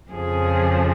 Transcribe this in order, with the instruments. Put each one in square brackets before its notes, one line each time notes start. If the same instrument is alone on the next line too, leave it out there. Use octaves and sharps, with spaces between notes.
[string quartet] F2 C#3 F3 G#4